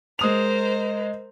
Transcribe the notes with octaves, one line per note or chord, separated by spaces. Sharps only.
G#3 A#4 C5 D#6 F7